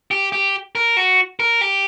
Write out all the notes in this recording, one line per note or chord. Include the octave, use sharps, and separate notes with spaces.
G4
G4
A#4
F#4
A#4
G4